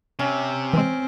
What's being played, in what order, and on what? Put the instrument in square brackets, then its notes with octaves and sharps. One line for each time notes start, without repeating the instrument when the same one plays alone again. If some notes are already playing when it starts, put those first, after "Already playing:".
[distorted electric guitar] C3 [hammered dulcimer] C#4
[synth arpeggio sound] E3 G#3 [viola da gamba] C4